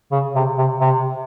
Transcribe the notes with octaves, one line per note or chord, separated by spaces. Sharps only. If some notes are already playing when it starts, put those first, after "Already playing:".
C#3
C3
C3
C3